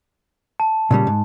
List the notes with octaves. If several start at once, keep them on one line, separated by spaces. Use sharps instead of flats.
A5
A#2 C#3 G3
G#2